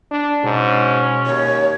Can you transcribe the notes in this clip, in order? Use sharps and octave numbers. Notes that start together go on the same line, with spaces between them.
D4
G#2 B2 C#4
D#2 C#5